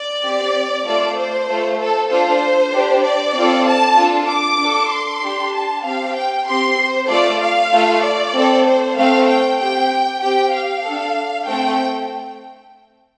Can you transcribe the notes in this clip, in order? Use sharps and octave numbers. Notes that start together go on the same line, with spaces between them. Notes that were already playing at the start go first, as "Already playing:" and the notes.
Already playing: D5
C4 G4
A3 F4 A4 D5
C5
A3 F4 A4
A4
D4 F4 A4 C5
D4 G4
D5
C4 F4 A4
A5
D4 F4 A4
D6
D4 A4
C6
D4 G4
A5
C4 G4 F5
G5
C4 G4 C6
C5
A3 F4 A4 D5
F5
A3 F4 A4
D5
C4 A4
C5
A3 C4 A4 F5
G5
C4 G4 G5
C4 G4 G5
F5
D4 A4
A3 C4 A4 G5